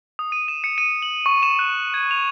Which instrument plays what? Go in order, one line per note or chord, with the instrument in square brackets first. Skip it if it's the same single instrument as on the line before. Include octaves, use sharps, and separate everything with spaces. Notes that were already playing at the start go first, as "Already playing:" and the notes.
[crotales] D#6
D#7
E7
C#7
D#7
F#7
C#6
E7
F#6
G#6
F7